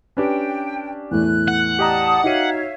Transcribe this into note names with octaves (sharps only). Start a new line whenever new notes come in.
C#4 D4 G4 B4 G5
E2 A2 F#6
F#5
G4 D5 D#5 A5 A#5 D#6
D#4 F#4 C#5 E5 F5 D#7